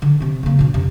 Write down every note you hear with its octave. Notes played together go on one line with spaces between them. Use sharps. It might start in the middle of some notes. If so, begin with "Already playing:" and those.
D3
C3 C4
C#3 A#3
B2 D4
F2 C3